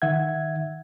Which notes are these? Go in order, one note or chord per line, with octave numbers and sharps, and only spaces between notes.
D#3 E5 F#5 G#6